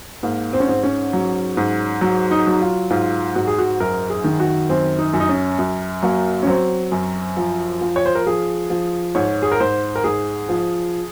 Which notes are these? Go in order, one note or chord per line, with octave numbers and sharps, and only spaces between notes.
G#2 A#3
C4
C#4
G#2 C4
C#4
F#3
G#2
F#3
D#4
F#3
F4
G#2 F4
G#2 F#4
G#4
F#4
F#2 A#4
G#4
D#3
F#4
F#2 C4
D#4
F#2
D#4
C#4
F#2
F#3 A#3
C#4
F#3 C4
F#2
F3
F3
C#5
C5
A#4
F3 G#4
F3
G#2 C#5
G#4
A#4
G#2 C5
A#4
G#2 G#4
F3